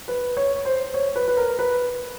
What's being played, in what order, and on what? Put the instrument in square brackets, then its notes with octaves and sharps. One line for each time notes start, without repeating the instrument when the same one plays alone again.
[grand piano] B4
C#5
C5
C#5
B4
B4
A#4
B4